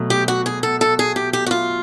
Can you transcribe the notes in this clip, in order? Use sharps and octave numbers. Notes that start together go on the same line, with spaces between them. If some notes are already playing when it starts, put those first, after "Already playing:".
Already playing: B2 F#3 A3
G4
F#4
G#4
A4
A4
G#4
G4
G4
F#4
F4